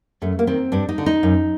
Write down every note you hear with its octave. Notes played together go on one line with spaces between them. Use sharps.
F#2 A3
A#3
D#3 C4
G2 D4
D#4
D3
D#4
F#2